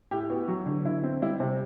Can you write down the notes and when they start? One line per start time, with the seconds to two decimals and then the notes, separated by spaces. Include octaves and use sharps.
0.11 A2 G4
0.30 B3 F#4
0.48 F#3 F#4
0.66 D3
0.85 D3 E4
1.03 C4
1.22 G3 E4
1.40 C3